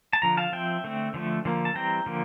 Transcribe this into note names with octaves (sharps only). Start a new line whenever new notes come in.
A5
D3 F3 A#5
F5 A5
F3 C4 E5 G5
D3 A3 C4
D3 F3 A3
D3 F3 A#3
A5
E3 G3 C4 G5 A#5
D3 F3 A#3